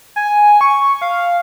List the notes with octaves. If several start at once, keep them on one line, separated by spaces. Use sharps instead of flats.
G#5
C#6
F5